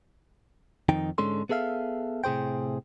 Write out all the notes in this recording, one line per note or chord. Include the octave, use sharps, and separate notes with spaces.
F2 D#3 D#4 G5
G#2 D3 G#3 C#4 A4 C6
B3 G#4 A4 E5 F5
A2 C3 G#4 C5 G5